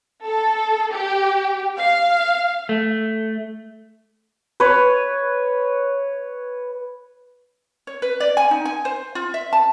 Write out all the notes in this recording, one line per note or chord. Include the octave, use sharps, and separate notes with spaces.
A4
G4
F5
A3
B4 C#5
C#5
B4
D5
G#5
D#4
G#5
C5
F4
E5
A5